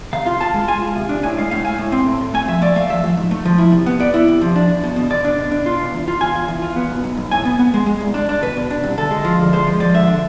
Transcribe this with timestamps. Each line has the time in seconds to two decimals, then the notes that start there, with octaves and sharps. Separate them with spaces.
0.13 C3 F5
0.26 F4
0.41 F4 A5
0.54 G#3
0.68 F4 G#5
0.82 F4
0.96 C3
1.09 D4
1.23 A2 G#5
1.38 G#3 F5
1.51 A2 F5
1.65 A2 G#5
1.79 A2
1.92 C4
2.06 A2
2.21 A2
2.34 A3 G#5
2.48 F3 E5
2.62 A3 D5
2.76 A3 F5
2.90 F3 E5
3.04 F3
3.17 G#2
3.31 A3
3.45 F3
3.58 E4
3.72 C3
3.86 B3
4.00 B3 D5
4.14 E4
4.28 C3
4.42 F3
4.56 D4
4.69 E2
4.84 B2
4.96 B2
5.10 B2 D5
5.25 D4
5.38 B2
5.51 D4
5.66 F4
5.79 B2
5.94 E2
6.08 F4
6.21 F4 G#5
6.35 E2
6.48 E2
6.62 F4
6.76 B3
6.90 B1
7.04 B1
7.17 B1
7.31 A2 G#5
7.45 B3
7.59 B3
7.74 G#3
7.86 G#3
8.01 C2
8.14 D4
8.29 D4
8.42 B2 B4
8.57 B2
8.70 D4
8.84 C2
8.98 D2 A4
9.11 G#3
9.25 F3
9.39 D2
9.53 G#3 C5
9.67 F3
9.80 F3 D5
9.94 D3 E5
10.08 D3